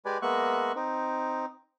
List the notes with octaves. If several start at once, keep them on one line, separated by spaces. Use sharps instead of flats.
G#3 G4 B4 D5 G#5
G#3 A#3 B3 E5 C#6 F#6
C4 D#4